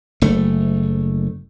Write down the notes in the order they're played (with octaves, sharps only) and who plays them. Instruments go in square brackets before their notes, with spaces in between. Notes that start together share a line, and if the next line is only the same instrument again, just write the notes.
[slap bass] F#1 A3